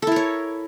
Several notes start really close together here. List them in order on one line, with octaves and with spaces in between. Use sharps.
A4 E4 A#4 C#5